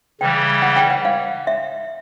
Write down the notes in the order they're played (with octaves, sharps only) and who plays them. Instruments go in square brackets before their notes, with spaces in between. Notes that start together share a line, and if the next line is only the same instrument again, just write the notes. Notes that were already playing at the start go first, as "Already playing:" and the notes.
[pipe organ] C#3 E3 G3 [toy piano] G5
[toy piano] F#5
G5
F#5
F5
E5